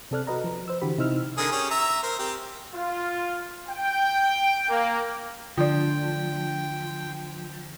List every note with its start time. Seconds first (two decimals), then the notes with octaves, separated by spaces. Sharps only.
0.11 C3 C4 A4 D5 F6 F#6
0.27 F#4 B4 D#5 A#5
0.44 F3 B4
0.68 C5 E6
0.81 D3 E3 F#4 G4 B5
0.98 C3 D#4 E4 C5 E6 F6
1.38 D3 G#4 A#4
1.52 C#4 G4 G#4
1.71 E5 A#5 E6
2.03 A#4 C5
2.19 C4 G4
2.75 F4
3.69 G5
4.69 A#3
5.58 D3 F3 F4 D5 G5